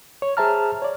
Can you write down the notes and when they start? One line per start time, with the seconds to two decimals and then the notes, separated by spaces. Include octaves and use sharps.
0.22 C#5
0.37 G#4 C5 E5 A5 A#5 F6
0.82 C#5 D5